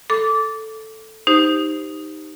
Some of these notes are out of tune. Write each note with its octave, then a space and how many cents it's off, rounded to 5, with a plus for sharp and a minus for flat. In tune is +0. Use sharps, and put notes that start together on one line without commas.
A4 +0 D6 -15
D#4 +0 G4 +0 C5 -10